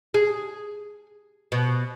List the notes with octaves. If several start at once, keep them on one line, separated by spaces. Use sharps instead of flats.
G#4
B2